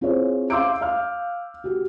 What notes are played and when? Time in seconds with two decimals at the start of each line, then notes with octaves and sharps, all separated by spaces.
0.01 C4 E4 F4 G#4 C5 C#5
0.50 F5 C6 D6 E6 G6 D7
0.81 F5 F6
1.64 F#4 G4